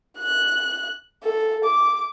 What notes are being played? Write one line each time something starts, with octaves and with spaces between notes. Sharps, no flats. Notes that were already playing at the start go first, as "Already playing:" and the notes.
F#6
A4
D6